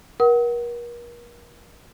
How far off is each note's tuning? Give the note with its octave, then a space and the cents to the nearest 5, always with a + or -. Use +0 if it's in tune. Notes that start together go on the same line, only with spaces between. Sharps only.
A#4 +40 F#5 +20 D#6 +45